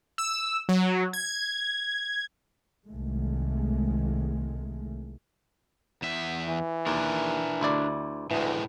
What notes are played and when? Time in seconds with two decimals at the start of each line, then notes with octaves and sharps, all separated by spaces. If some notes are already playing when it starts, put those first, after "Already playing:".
0.18 E6
0.69 F#3
1.13 G#6
2.87 C2 D#3 G#3 A3
6.02 E2 E5
6.48 E3
6.87 D#2 D4 A#4
7.61 D2 E4 D5
8.31 D2 A2 E3 G#3